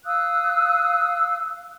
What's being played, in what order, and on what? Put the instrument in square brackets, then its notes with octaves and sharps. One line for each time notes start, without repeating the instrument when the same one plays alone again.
[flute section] F5 D#6 E6 F#6